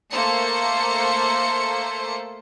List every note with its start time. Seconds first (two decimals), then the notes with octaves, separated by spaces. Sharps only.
0.11 A3 A#3 A4 C5 C#7